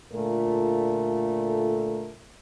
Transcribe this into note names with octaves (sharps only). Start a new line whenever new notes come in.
A#2 D3 A3 F4 A4 A#4